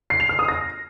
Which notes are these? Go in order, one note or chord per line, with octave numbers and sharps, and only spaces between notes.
C7
F7
F6
D#6
A#6